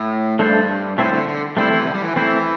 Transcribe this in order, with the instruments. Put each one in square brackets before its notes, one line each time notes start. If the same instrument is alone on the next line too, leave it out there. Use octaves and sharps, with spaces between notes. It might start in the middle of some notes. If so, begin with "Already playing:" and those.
Already playing: [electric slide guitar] A2
[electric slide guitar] G2 [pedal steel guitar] A3 D4 A4 C5
[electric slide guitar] A2 [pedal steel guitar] A3 C4 E4 C5
[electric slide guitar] D3
D3
[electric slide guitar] G3 [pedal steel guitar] A3 C4 E4 C5
[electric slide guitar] E3
C3
D3
G3
E3
[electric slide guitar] E3 [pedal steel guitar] A3 C4 E4 C5